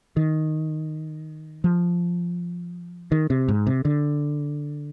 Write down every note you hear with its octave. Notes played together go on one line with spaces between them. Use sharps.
D#3
F3
D#3
C3
G#2
C3
D3